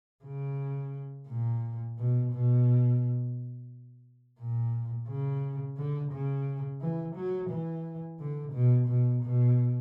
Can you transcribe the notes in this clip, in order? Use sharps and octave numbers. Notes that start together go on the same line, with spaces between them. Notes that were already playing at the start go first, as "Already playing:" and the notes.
C#3
A#2
B2
B2
A#2
C#3
D3
C#3
E3
F#3
E3
D3
B2
B2
B2